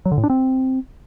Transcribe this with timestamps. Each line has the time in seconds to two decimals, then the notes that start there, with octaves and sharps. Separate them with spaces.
0.06 F#3
0.12 D3
0.18 A2
0.24 D4
0.30 C4